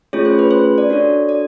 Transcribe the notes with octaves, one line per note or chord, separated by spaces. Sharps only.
A3 C#4 F4 G#4 C#5
C5
B4
C5
D5
D4 F#4 A4 C#5
D5